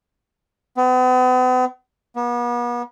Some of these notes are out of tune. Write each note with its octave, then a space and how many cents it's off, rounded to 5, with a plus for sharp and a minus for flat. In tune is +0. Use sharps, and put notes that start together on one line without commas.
B3 +45
B3 -40